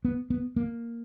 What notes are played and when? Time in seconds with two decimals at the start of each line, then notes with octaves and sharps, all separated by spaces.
0.05 B3
0.30 B3
0.56 A#3